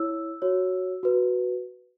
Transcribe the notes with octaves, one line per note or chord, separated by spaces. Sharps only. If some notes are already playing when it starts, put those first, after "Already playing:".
Already playing: E4 C#5 E6
F#4 C#5
F#4 B4